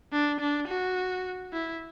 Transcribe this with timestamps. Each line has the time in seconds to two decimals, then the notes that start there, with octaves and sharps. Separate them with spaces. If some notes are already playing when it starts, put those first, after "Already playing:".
0.13 D4
0.40 D4
0.68 F#4
1.53 E4